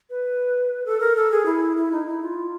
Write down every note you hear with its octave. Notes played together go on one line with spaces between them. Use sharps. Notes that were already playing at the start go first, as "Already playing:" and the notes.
B4
A4
A#4
A4
G#4
E4
E4
D#4
E4
F4